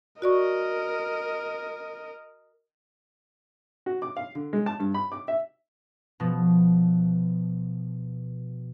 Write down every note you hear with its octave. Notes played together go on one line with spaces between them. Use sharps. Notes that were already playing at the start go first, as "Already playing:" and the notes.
F#4 A#4 D5 D#5 C#6
F#4
D6
F5
D3
G#3
A5
G2
B5
D6
E5
B2 F3